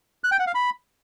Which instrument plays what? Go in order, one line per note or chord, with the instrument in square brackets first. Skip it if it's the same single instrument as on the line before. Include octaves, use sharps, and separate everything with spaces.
[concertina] F#6
G5
F#5
F5
B5